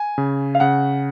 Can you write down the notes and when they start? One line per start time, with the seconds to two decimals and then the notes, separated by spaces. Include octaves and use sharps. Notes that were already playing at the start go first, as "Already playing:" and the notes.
Already playing: G#5
0.18 C#3
0.55 F5
0.60 C#3 F#5